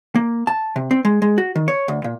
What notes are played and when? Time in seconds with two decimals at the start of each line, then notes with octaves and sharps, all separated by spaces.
0.15 A#3
0.47 A5
0.76 C3
0.91 C4
1.05 G#3
1.22 G#3
1.38 F#4
1.56 D#3
1.68 C#5
1.88 D2
2.04 A#2